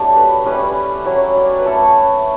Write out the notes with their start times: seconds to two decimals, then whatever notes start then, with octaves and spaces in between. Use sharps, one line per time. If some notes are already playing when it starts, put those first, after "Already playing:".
Already playing: F#3 A3 D4 E4 G4
0.16 B4
0.46 G3 C#4 E4 B4
1.05 F#3 C#4 E4
1.36 D5
1.58 B4
1.66 A3 C#4 E4 A4